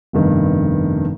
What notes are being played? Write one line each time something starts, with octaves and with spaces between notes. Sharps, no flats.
F1 G2 D#3 B3